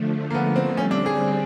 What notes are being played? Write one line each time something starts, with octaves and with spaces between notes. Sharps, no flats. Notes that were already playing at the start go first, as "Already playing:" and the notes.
Already playing: D3 F3 A3
A#3
B3
C4
D3 G3 C4 C#4
D4
G#4